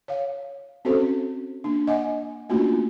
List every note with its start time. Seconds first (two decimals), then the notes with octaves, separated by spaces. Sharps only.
0.08 C#5 F5
0.85 C4 C#4 F#4 A4 C5
1.64 A#3 D4
1.88 D#5 F#5 G#5
2.49 A3 A#3 C#4 D4 F4 F#4